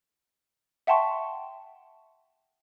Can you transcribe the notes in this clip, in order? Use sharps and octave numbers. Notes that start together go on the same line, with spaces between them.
E5 F#5 G5 A5 C6 C#6